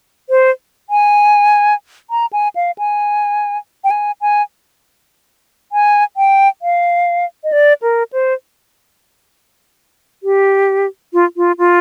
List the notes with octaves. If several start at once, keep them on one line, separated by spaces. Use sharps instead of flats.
C5
G#5
A#5
G#5
F5
G#5
G5
G#5
G#5
G#5
G5
F5
D#5
D5
A#4
C5
G4
F4
F4
F4